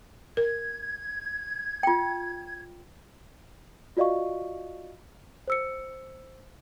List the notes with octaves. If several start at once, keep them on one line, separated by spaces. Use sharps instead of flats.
A#4 G#6
F4 G5
F4 F#4 D5 D#5 F5 C#6
C5 E6 C#7